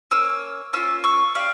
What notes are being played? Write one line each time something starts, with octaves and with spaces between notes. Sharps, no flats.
A#3 C#4 E6
A#3 C#4 F4 E6
C#6 E6
C#4 G4 D5 F5